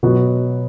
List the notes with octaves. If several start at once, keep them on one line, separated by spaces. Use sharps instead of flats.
B2 F#3 B3 F#4